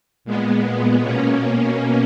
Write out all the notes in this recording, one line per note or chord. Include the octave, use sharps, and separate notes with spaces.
A#2 G#3 B3
B2 A#3 C#4